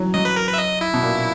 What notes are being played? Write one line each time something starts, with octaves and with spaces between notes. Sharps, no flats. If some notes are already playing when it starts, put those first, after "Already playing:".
Already playing: E3 F#3
F#3 D#5
B4
A#4
B4
E5
D#5
E4
B2
A#2